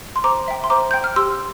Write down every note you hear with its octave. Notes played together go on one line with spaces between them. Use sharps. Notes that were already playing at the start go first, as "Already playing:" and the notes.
C6
C5 A#5 D6
E5 G5
C6
C5 A#5 D6
G5 G6
F6
G4 C6 E6